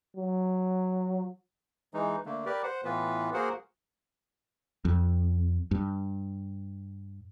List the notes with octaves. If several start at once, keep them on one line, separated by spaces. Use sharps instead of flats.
F#3
E3 G#3 D#4
D3 A3 A#3
G4 A#4 B4 D5
C5 F#5
A2 E3 B3 F4 B4
A#3 F#4 G#4 A#4 C5 F#5
F2
G2